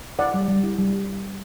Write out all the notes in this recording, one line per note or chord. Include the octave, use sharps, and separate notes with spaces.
E4 D5 F#5
G3
G3
E4
G3